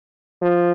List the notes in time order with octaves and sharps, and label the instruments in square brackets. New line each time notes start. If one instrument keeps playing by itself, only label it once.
[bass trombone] F3